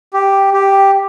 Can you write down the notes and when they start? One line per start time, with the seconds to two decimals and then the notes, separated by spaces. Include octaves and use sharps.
0.14 G4
0.54 G4